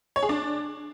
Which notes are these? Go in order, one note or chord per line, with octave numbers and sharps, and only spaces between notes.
C#5
G#4
D4